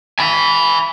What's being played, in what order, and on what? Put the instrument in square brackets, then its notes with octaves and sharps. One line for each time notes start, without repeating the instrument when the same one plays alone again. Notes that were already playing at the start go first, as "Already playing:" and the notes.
[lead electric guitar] G#5 B5